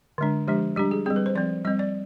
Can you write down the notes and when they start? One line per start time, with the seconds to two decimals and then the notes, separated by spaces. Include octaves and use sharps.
0.18 D3 G#3 D4
0.47 F3 G#3 D4 G4
0.76 G3 D4 G4
0.91 G#4
1.06 G3 C4 G#4
1.16 B4
1.26 C5
1.35 F3 C4 D5
1.65 G3 C4 D#5
1.79 D5